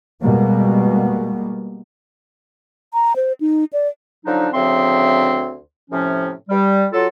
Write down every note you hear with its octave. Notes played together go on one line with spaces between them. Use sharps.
B2 G3 G#3 A#3 B3
A#5
C5
D#4
D5
D3 F3 F#3 D4 D#4
D2 C#3 F3 C4 E5 C6
A2 C3 F3 C#4
G3
F#3 F4 A4